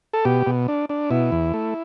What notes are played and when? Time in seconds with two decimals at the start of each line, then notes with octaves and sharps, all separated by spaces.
0.13 A4
0.25 B2 G4
0.47 B2
0.68 D4
0.89 D4
1.11 B2 E4
1.32 E2
1.54 A3